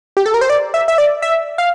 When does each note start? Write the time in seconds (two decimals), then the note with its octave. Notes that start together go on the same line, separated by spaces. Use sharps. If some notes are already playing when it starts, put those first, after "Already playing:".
0.17 G4
0.26 A4
0.34 A#4
0.41 C5
0.50 D5
0.74 E5
0.88 E5
0.98 D5
1.22 E5
1.58 F5